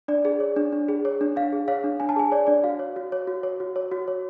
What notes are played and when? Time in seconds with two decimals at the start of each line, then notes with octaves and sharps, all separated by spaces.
0.08 D4 D5
0.25 G#4
0.40 C#5
0.56 D4
0.72 D4
0.88 G#4
1.05 C#5
1.21 D4
1.36 D4 F5
1.52 G#4
1.68 C#5 F5
1.84 D4
2.00 D4 G#5
2.09 A5
2.16 G#4 G#5
2.32 C#5 D5
2.47 D4 D5
2.63 F#4 F5
2.79 C#5
2.96 F#4
3.12 C#5
3.27 F#4
3.43 C#5
3.60 F#4
3.76 C#5
3.92 F#4
4.08 C#5